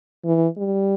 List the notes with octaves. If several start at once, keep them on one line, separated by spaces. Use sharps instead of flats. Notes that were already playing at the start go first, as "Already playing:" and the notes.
E3
G3